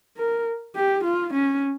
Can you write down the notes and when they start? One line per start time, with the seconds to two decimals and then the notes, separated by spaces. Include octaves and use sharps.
0.17 A#4
0.75 G4
1.04 F4
1.33 C#4